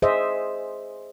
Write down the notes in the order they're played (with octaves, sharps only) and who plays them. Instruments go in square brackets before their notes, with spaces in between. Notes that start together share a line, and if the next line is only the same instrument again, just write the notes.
[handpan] G#4 C5 D#5 E5